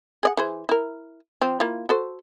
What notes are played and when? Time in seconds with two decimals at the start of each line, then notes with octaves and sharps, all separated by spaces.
0.23 G#4 D5 F#5
0.37 E3 G#4 C5
0.69 E4 A#4
1.41 F3 C4
1.60 A#3 E4 F4
1.89 F#4 A4 C5